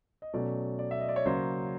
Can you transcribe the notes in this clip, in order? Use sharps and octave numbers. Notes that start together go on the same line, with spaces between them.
D#5
B2 F#3 A3 C#4 D5
D5
E5
D#5
D5
C#5
C#3 F#3 A#3 C5